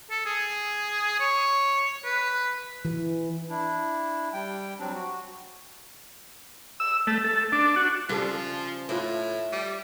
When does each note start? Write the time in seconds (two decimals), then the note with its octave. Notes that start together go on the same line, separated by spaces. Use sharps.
0.11 A4
0.26 G#4
1.20 C#5
2.05 B4
2.85 E3
3.49 D4 E4
4.33 G3 G5
4.79 F#3 G3 C4 D4
4.93 F#4
6.80 E6
7.07 A3
7.24 A4
7.52 D4
7.76 F#4
8.09 C#3 F3 G3 A4
8.89 A2 A3 F4 B4
9.52 G3